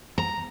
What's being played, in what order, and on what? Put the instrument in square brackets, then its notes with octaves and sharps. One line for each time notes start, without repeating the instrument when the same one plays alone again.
[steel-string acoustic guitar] A#5